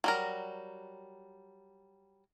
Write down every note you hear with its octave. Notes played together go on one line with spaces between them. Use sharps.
F#3 G3 A#4